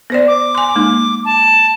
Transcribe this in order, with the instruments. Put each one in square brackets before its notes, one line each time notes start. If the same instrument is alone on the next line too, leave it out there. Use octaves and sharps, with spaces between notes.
[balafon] B3 C5 D5
[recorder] D6
[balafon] G#5 C6
G#3 A#3 D#4
[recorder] A5